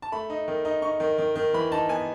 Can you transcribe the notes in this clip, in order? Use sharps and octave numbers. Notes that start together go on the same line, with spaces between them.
A5
A3 B5
D#4
D#3
D#4
D#4 C#6
D#3
D#3
D#3
E3 B5
D#4 A5
B3 G#5